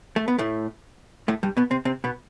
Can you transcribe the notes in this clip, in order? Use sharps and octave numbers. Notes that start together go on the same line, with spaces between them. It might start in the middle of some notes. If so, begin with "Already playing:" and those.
A3
B3
A2 A3
A2 A3
G2 G3
B2 B3
C3 C4
C3 C4
B2 B3